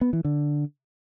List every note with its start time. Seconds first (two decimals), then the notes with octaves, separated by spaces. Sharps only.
0.01 B3
0.13 E3
0.25 D3